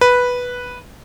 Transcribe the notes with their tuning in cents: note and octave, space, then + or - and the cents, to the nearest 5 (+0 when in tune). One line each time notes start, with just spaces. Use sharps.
B4 -5